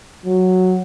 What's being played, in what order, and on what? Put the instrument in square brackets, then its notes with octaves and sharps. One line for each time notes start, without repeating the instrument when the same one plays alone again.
[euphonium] F#3